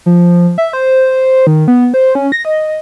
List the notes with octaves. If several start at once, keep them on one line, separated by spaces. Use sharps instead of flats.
F3
E5
C5
D#3
B3
C5
C#4
A#6
D#5